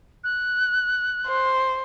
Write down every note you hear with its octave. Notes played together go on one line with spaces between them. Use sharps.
F#6
C5